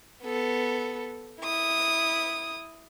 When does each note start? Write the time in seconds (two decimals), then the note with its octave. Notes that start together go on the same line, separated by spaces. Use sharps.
0.24 B3 A4
1.40 E4 D#6